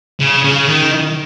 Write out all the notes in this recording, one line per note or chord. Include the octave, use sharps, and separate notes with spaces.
C#3
C#3
D#3